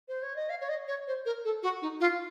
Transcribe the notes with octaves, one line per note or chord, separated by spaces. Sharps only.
C5
C#5
D#5
F5
C#5
D#5
C#5
C5
A#4
A4
F#4
D#4
F4